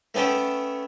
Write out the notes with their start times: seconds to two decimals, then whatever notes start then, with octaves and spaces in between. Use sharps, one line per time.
0.14 A3 B3 C#4 A4 G5